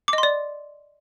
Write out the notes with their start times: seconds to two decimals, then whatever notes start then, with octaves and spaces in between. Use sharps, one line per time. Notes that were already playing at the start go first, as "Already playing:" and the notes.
0.08 D6
0.13 D#5
0.18 C6
0.23 D5